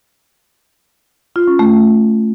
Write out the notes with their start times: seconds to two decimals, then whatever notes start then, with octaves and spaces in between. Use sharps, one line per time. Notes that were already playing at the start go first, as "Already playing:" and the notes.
1.36 F4
1.47 C#4
1.59 A3